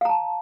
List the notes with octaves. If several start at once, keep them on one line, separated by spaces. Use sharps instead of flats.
F5 A5 A#5